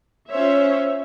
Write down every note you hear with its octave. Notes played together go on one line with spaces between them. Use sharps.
C#4 F4 C5 C#5 E5